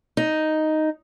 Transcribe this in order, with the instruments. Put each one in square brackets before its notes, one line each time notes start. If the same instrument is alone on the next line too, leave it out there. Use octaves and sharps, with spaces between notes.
[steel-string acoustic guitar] D#4